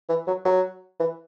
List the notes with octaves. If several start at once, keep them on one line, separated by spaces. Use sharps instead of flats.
E3
F#3
F#3
E3